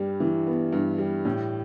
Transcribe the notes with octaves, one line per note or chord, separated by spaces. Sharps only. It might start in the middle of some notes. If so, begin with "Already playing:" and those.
Already playing: G2 G3
E3
B3
G2
G3
A2